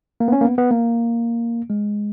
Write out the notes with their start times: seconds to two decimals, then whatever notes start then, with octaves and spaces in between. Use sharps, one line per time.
0.20 A#3
0.28 B3
0.32 C#4
0.41 A#3
0.45 B3
0.58 B3
0.71 A#3
1.70 G#3